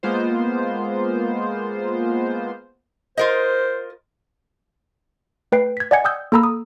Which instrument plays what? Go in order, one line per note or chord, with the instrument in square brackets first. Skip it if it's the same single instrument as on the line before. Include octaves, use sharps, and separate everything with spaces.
[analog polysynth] G#3 A#3 B3 F4 C5
[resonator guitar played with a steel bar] F4 A#4 D#5 [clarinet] C5
[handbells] A3 B4 G5 C7
G#6 B6
D5 D#5 F#5 G#5 G#6 C#7
G5 D#6 E6 G6
A#3 A4 A#5 B5 E6
D#6